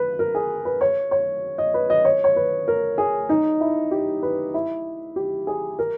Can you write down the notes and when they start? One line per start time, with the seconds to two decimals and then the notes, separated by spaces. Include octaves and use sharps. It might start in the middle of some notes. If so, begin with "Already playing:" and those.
Already playing: B4
0.19 A#4
0.35 G#4
0.65 B4
0.81 C#5
1.11 C#5
1.58 D#5
1.74 B4
1.90 D#5
2.05 C#5
2.24 C#5
2.36 B4
2.68 A#4
2.98 G#4
3.29 D#4
3.61 E4
3.91 G4
4.23 B4
4.54 E4
5.16 G4
5.47 G#4
5.79 A#4